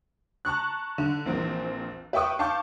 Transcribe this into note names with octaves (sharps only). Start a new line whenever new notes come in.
A5 A#5 C#6 F#6
D3
A#1 E3 C4 A#4
B4 E5 G5 C#6 D#6
F5 A5 C#6 D6 G6